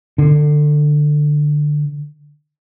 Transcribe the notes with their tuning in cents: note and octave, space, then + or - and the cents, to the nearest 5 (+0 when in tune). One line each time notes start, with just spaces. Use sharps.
D3 +15